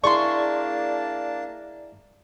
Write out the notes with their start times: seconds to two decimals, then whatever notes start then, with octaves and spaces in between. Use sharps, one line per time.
0.04 A#3 D4 E4 G#4 D5 A5 C6 C#6